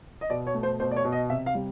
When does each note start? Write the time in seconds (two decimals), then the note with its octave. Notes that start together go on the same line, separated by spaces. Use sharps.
0.21 D#5
0.30 B2 D5
0.47 C#5
0.54 A3
0.63 C5
0.80 B2 C5
0.91 D5
0.96 C#5
1.04 B2
1.12 D#5
1.30 C3 E5
1.46 F5
1.55 G3